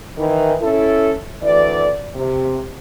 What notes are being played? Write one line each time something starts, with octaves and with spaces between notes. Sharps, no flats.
D#3 E3
C#4 E4 A4
D2 E3 D5
C3